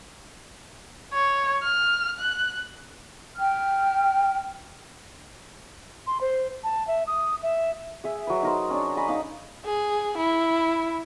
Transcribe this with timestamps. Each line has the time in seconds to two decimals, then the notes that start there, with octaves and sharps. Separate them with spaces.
1.14 C#5
1.63 F6
2.19 F#6
3.37 G5 F6
6.07 C6
6.21 C5
6.64 A5
6.88 E5
7.07 D#6
7.43 E5
8.04 G#4 E5
8.27 F#3 B4
8.43 D#4 A#4 C5
8.70 C#4 D4
8.97 D#5 G#5 A#5 B5
9.08 D#4 F5 D6
9.65 G#4
10.18 E4